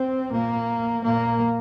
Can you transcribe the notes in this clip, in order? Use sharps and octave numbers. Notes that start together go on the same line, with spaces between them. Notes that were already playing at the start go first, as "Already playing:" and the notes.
Already playing: C4
A#2 A#3
A#2 A#3